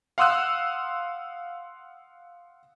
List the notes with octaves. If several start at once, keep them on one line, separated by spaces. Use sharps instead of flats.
F5 F#5 C6 D#6 E6 F#6